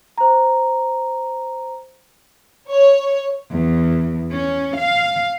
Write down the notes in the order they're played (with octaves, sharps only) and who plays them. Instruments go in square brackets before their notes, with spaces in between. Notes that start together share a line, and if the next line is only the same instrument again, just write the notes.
[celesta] C5 A#5
[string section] C#5
[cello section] E2
C#4
F5